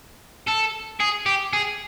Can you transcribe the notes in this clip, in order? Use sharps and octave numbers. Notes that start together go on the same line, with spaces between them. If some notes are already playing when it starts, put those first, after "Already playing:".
A4
G#4
G4
G#4